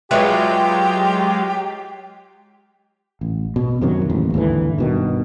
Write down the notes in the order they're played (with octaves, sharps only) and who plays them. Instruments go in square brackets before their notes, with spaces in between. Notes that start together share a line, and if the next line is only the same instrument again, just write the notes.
[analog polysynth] F#3 G#3 F4 [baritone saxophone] G4 [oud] B4 C#5 E5
[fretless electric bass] A1
B2
F#2 C3 D#3 F#3
A1 D#2
D#2 G#2 D3 E3
G2 B2 D#3